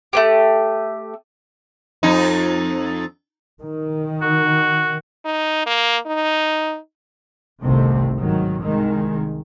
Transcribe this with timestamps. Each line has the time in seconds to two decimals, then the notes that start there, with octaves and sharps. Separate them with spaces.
0.13 A3 B3 G4
2.03 F2 D#4
3.61 D#3
4.22 F#4
5.25 D#4
5.66 A#3
6.07 D#4
7.62 G1 C2 C3 D#3 A3 C4
8.16 G#2 D#3 F#3
8.61 C2 D#3 G#3